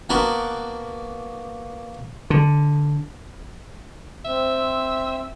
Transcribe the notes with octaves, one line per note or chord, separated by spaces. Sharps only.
A#3 B3 D4 F#4 A#4 B4
D3
C4 E5